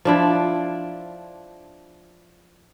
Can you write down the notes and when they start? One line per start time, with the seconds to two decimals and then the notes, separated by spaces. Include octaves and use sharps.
0.05 F3 D4 E4